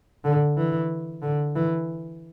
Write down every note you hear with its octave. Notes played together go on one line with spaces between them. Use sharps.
D3
E3
D3
E3